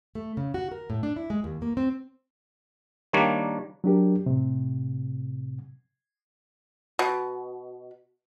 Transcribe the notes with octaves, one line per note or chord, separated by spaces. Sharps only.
A3
C#3
F#4
A#4
A2
D4
E4
G#3
D#2
A#3
C4
D#3 G3 A#3 D4 C#5
F#3 D4 G4 A#4
A2 C3
B2